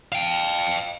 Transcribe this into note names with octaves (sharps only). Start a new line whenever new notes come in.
F5 G5